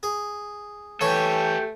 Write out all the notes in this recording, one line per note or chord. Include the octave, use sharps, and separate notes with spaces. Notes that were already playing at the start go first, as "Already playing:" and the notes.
G#4
E3 A3 G4 A4 C#5 C#6